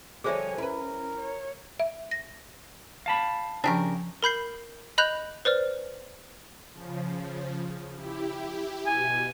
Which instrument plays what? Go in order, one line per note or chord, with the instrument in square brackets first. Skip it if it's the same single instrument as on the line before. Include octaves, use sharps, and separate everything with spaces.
[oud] D3 F3 G3 [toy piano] G#4 C5 E5 [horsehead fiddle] C#5 G#5
[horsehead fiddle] C#4 [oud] E4 B4 [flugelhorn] A#4
[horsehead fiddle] C#5
[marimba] E5
A#6
[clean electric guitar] F5 A5 B5
[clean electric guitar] C#3 [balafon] F3 G#5 [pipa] D4 G4 A#4
[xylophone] A#4 B5 G6 C7
D#5 B5 F#6 G6 F7
B4 C5 D5 F6
[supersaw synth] C#3 F3
E4 G4
[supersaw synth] B2 [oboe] G#5